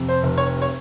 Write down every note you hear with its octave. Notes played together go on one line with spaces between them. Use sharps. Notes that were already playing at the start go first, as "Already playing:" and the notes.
Already playing: F2 C3
C5
F1
C#5
C#5